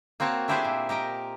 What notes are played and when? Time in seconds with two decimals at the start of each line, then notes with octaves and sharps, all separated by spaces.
0.20 A#3 C4 F#4 C#5 A5
0.48 A3 D4 E4 G4 G#4 C5
0.65 A#2
0.89 G4 A#4 D#5 G5